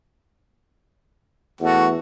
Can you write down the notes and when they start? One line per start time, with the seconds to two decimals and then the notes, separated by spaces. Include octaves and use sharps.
1.61 E2 A3 F#4